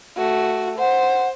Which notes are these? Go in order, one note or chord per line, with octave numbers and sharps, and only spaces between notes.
A3 F#4
C5 F#5